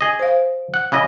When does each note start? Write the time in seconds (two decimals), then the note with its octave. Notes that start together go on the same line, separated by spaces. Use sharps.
0.01 G#4 D#5
0.19 C5 F5
0.74 F#5
0.92 C#3 E4 D#5